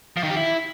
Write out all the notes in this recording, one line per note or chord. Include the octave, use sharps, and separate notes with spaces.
F3
D#3
G4
E4